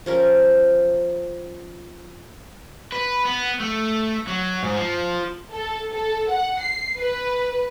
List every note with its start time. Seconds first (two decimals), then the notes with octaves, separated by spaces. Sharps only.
0.06 F3 C#4 A#4
2.92 B4
3.25 B3
3.60 A3
4.28 F#3
4.63 G#2
4.76 F3
5.53 A4
5.92 A4
6.29 F#5
6.60 C7
6.97 B4